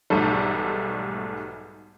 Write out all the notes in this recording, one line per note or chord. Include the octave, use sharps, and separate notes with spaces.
B1 E2 G#2 G3 A3